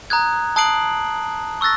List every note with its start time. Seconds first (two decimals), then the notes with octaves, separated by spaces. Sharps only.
0.10 A#5 D#6 F#6 G#6
0.56 A5 D#6 F#6 C7 D7 F#7
1.61 C#6 E6 F#6 A6 A#6